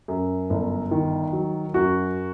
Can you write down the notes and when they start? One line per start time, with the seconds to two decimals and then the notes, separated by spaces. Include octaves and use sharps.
0.08 F#2
0.50 G1
0.91 D#3
1.33 F#3
1.74 F#2 F#4